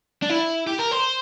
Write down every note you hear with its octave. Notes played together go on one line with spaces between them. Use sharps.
D4
E4
G4
A#4
C5